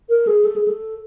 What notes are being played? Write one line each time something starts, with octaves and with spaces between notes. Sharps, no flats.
A#4
G#4
A4
G#4
A4